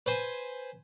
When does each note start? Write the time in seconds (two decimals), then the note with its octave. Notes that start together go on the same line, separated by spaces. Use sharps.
0.06 B4 C5 G#5